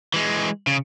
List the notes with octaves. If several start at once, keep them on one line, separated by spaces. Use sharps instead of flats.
E3 G#3
C#3